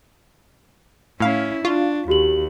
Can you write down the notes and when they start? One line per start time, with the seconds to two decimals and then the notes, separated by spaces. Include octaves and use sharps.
1.20 A2 C#4 E4 F5
1.65 D4 F4 C#6
2.08 D#2 F#4 G4 F#7